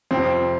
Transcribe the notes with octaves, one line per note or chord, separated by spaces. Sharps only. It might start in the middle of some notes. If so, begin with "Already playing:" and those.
F2 C3 F3 C4